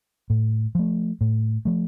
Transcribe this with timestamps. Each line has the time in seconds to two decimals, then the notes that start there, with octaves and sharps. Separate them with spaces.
0.30 A2
0.75 F3 A3
1.21 A2
1.65 F3 A3